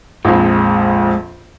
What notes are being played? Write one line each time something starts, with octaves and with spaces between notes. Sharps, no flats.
A#1 F2 G#3